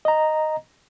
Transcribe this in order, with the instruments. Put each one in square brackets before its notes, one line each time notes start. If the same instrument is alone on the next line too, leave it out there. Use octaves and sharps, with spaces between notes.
[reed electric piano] D#5 A#5